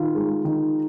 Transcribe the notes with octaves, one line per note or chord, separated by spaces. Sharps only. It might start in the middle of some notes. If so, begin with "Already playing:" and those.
Already playing: D#3 F4
G#3
D#3